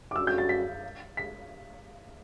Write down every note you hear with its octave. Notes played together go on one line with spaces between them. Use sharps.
D6
D3 G3 C#4 F#4 E6
G6
A6
B6
B6